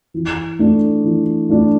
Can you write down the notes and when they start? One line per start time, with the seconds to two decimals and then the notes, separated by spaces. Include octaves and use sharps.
0.14 E3
0.59 A3 D4
1.04 E3
1.49 A3 D4